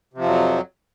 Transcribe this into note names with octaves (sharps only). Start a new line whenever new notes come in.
F2 C3 F3 F#3